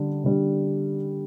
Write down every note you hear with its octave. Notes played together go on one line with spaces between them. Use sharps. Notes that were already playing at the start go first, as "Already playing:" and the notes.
Already playing: D3 G3 D4
D3 G3 D4